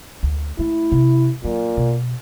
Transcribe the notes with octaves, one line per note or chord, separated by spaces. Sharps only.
D2
A3 E4
C3
A#2 F#3
B2